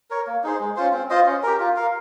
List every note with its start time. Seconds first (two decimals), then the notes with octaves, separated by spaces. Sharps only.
0.10 A#4 C#5
0.27 A#3
0.44 D#4 G#4 C5
0.60 G#3
0.76 C#4 F4 C5
0.93 C4
1.10 F4 C5 D#5
1.27 C#4
1.43 G4 A#4
1.60 F4
1.76 A#4 F5